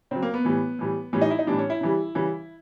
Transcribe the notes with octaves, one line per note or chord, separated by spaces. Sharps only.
C#3 F#3 C4
A#3
B3
A2 E3 G3
A2 E3 G3
A2 E3 G3 C#4
D#4
E4
D#4
A2 E3 G3 D4
C#4
E4
C#3 E3 G3
C#3 E3 G3